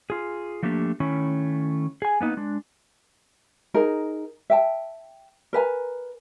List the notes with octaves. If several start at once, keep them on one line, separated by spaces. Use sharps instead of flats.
F4 G#4
F3 A3 A#3 D4 G4
D#3 A3 C#4 E4
G#4 G#5
A#3 B3 D#4
G#3 D4
D#4 G#4 A#4
E5 G5 A5
A#4 B4 G#5 A#5